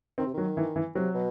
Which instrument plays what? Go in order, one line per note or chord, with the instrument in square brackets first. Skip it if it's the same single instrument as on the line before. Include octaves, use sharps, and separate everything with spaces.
[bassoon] D#3 [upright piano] C4
[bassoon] C3
[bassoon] D#3 [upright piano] F#3
[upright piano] E3
E3
[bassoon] C3 [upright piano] F#3
[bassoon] B2